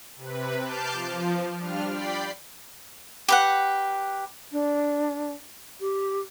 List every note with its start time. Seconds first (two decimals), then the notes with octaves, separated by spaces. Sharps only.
0.16 C3 B4
0.61 A5 D6 F6 G6 C7
0.92 F3
1.58 G3 D4 F4 F6
1.88 D5 G5 B5 C7
3.28 G4 B4 F#5
4.52 D4
5.81 G4